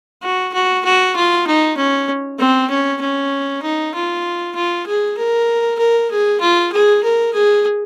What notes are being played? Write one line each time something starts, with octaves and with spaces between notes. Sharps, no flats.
F#4
F#4
F#4
F4
D#4
C#4
C4
C#4
C#4
D#4
F4
F4
G#4
A#4
A#4
G#4
F4
G#4
A#4
G#4